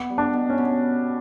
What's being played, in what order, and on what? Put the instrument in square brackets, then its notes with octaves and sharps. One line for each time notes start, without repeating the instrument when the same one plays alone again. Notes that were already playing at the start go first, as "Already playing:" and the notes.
Already playing: [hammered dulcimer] B3
G3
[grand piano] D4
[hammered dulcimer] B2
[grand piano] C#4
[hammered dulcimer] B2